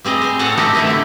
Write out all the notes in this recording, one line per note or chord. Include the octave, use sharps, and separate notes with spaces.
G3 C4 G#4 D#5
C5 G#5
A2 C4 A4 C#5 F#5 A5
E3 C4 D#4 G4 A#4 C5
D3 D#3 A3 E4 D#5
D3 E4